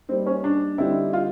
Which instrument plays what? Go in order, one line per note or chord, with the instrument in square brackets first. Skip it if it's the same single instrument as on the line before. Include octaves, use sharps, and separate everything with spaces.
[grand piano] G3 A#3 D#4 [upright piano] C4
[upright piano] C#4
D4
[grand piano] D3 G3 C4 D#4 G4 [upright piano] E4
[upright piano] F4